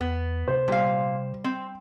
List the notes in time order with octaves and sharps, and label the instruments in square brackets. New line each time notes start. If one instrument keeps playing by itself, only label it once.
[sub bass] E2 [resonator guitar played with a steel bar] B3
[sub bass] C3 [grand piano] C5
[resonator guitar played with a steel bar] A#2 F5 [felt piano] G3
[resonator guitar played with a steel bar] C4